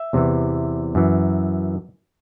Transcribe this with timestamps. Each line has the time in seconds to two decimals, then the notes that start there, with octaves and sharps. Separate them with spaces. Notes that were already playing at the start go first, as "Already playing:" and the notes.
Already playing: E5
0.13 E2 C3 E3
0.95 F#2 E3